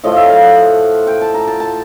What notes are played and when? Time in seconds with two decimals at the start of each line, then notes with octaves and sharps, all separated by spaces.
0.04 A2 F3 A3 D#5
0.16 E5
0.30 F5
0.43 F#5
1.07 G5
1.21 A5
1.34 A#5
1.47 A5
1.60 A5